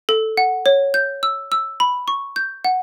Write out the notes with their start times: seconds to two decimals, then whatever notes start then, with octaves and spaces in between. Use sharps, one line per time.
0.09 A4
0.37 F#5
0.66 C#5
0.94 G6
1.23 E6
1.52 E6
1.80 B5
2.08 C#6
2.36 G6
2.65 F#5